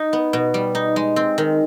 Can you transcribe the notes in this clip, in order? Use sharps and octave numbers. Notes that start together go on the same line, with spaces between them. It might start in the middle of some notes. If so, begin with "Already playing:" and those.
Already playing: D#4
B3
B2
G3
D#4
G#3
C4
D#3